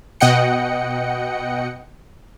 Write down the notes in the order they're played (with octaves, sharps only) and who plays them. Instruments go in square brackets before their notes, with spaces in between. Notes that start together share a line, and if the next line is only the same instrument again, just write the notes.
[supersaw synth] B2 D#5 F#5 G5 C#7